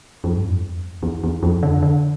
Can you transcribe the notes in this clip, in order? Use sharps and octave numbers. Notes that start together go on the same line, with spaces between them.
F2
G2
F2
E2
E2
E2
F2
D3
D3